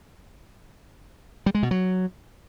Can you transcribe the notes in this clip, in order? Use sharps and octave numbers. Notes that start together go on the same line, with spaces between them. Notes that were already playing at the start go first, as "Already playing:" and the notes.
G3
G#3
B2
F#3